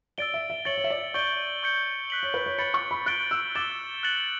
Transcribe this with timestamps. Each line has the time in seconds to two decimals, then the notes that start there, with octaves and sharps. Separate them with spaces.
0.18 D5 E6 A6 D7 G7
0.34 E5
0.50 E5
0.65 C#5 A6 C#7 F#7
0.78 C#5
0.84 E5
0.90 D5
1.14 D5 C#6 G6 D7 G7
1.63 C#6 G6 C#7
2.10 F#6 B6 F#7
2.23 C#5
2.34 B4
2.46 C#5
2.58 B5 A6 C#7 F#7
2.74 C#6
2.91 B5
3.06 F#6 A6 D7 G7
3.31 E6
3.55 D6 E6 A6 E7 G7
4.03 F#6 A6 C#7 F#7